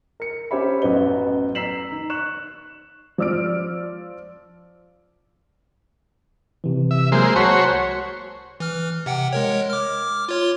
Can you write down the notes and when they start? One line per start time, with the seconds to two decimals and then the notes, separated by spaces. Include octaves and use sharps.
0.20 A#4 C#7
0.51 C#4 G4 C5 C#5 E5 B5
0.82 A1 F#2 B3 D#5 G7
1.55 A#5 E6 B6 C7 E7 F#7
1.92 D#3
2.10 C#6 F#6 E7
3.18 F3 D5 E6 F6 D7
6.64 C3 E3
6.91 E5
7.12 F#3 G#3 A#3 C5 G6
7.36 C2 F#4 C5 C#5 A5 B6
8.60 E3 F6
9.06 C3 F#5 G5
9.33 G#3 A#4 C#5
9.70 D6 F6
10.29 F4 C#5 C6